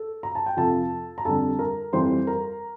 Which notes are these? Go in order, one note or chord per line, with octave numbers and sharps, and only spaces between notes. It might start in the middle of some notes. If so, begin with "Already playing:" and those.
Already playing: A4
A#5
A5
G5
F2 C3 F3 A4 A5
A#5
F2 D3 G3 A4 A5
A#4 A#5
F2 E3 G3 C5 C6
A#4 A#5